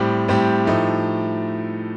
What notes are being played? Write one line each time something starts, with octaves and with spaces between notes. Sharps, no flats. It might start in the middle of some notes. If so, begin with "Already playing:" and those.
Already playing: A2 G3 C4 G4
A2 G3 C4 G4
A2 F3 A3 D#4 G4